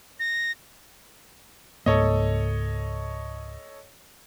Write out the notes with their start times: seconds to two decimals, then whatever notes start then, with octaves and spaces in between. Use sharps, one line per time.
0.20 A#6
1.86 C#2 G#2 A#3 A4 C#5 D#5